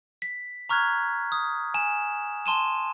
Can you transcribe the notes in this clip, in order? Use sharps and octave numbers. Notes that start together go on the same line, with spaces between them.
B6
A#5 C#6 F6 F#6 G#6
D#6
G#5 E7
A5 C6 D#7 E7